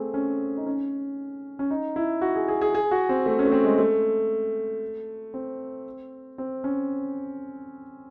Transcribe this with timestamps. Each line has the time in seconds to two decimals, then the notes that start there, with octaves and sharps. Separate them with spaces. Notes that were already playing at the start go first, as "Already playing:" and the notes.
Already playing: A3 C4 G#4
0.14 C#4
0.57 D#4
0.67 C#4
1.59 C#4
1.71 D#4
1.96 E4
2.21 F#4
2.35 G#4
2.48 G#4
2.62 G#4
2.75 G#4
2.91 F#4
3.09 C4
3.26 A3
3.39 C#4
3.45 A3
3.52 C4
3.64 G#3
3.78 A3
5.34 C4
6.38 C4
6.64 C#4